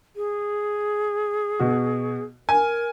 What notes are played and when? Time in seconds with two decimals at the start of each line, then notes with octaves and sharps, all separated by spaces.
0.16 G#4
1.60 B2 F#4
2.49 A#4 G#5